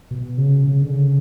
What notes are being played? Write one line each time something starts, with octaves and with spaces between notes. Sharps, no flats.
B2
C#3
C#3
D3
C#3